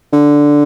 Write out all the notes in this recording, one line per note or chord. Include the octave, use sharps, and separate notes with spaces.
D3